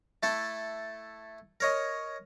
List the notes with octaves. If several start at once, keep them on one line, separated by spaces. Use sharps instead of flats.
A3 E4 A4 E5
A#4 C#5 D#5